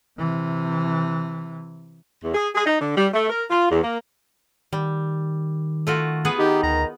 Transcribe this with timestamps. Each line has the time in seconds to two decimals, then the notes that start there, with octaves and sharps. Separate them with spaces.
0.19 C3 E3
2.22 E2
2.34 G#4
2.55 G#4
2.66 D#4
2.80 D3
2.96 G3
3.13 A3
3.29 A#4
3.50 F4
3.69 E2
3.83 A#3
4.73 D#3 G3
5.87 A3 F4 F#4
6.25 B3 G#4 B4
6.38 D#3 D#4 G4
6.63 D2 A#5